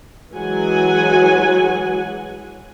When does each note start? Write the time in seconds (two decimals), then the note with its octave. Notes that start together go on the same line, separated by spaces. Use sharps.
0.34 E3 F#3 G#3 F#5 G#5